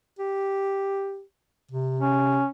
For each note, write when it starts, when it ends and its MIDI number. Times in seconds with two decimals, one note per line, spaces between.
0.19 1.22 67
1.71 2.43 48
1.99 2.47 61